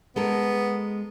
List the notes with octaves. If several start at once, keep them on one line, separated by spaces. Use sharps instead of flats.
G#3 B3 A4 A#4